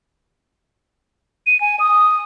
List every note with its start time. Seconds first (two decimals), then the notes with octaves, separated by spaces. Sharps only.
1.47 D#7
1.61 G#5
1.80 D#6